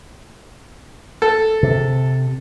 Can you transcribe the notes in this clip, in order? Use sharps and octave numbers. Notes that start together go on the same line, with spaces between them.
A4
C3